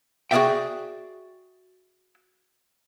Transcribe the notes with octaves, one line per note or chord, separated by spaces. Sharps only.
F#4 G#4 A#4 D5 E5 G5